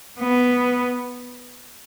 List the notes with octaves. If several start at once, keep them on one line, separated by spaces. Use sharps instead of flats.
B3